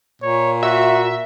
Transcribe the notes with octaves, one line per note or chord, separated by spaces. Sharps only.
A#2 C#5
F#4 E5